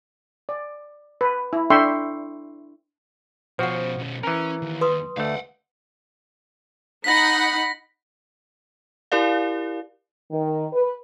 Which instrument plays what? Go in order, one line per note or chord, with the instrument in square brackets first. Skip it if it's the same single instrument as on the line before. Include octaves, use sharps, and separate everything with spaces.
[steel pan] D5
B4
E4
D4 A4 E5 G5 C6 C#6
[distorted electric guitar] B2 C#4 [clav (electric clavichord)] F3 F#4 [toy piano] C5 F#5
[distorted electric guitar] B1 C#4
[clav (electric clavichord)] E3 A#4 [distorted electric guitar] C#4
[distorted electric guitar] D#2
[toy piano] B4 C6 D#6
[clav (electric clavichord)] D2 A3 [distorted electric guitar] F5 F#5
[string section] D#4 F#5 B5 [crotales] A#6 B6
[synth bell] E4 G4 A#4 D5 F5
[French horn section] D#3
B4